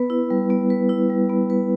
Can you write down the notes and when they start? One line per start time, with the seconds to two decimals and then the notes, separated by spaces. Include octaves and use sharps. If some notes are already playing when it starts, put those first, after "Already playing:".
Already playing: B3 B4
0.10 E4
0.30 G3
0.50 B3
0.70 B4
0.89 E4
1.10 G3
1.30 B3
1.50 B4